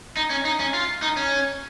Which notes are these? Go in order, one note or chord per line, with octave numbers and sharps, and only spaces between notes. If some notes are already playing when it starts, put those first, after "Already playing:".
D#4
C#4
D#4
C#4
F4
D#4
C#4